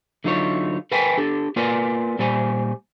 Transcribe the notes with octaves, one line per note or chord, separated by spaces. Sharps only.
D3 F#3 D#4 F4 A#4 C#5
A#4 B4 F5 G5 G#5
D4 G4 A4
A#3 F4 A#4 B4 D5 G#5
A#2 G3 C5 D5 G#5